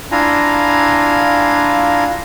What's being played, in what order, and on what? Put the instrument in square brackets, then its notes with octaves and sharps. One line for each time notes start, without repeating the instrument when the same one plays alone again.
[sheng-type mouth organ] D4 E4 F4 F5 G#5 A#5